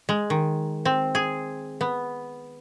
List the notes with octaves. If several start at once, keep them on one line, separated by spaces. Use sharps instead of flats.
G#3
D#3
C4
G#4
B3